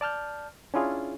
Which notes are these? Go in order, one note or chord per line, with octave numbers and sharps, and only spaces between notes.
D5 A5 F6 G6
C#4 D4 E4 F4 G#4